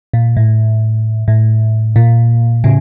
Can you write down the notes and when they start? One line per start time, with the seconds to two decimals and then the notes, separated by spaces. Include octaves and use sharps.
0.14 A#2
0.37 A2
1.28 A2
1.96 A#2
2.64 A2 C#3